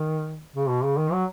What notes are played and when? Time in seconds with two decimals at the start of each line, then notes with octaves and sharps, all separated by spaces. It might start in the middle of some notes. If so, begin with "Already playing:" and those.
Already playing: D#3
0.56 C#3
0.69 B2
0.84 C#3
0.98 D#3
1.12 F#3